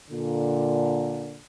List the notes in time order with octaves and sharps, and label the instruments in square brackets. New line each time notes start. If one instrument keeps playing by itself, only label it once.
[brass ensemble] A#2 D3